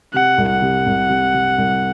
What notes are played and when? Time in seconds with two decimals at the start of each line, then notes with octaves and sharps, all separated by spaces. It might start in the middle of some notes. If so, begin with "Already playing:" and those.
0.13 C3 F#5
0.38 C2
0.50 F#5
0.62 C3
0.87 C2
1.09 C3
1.34 C3
1.58 C2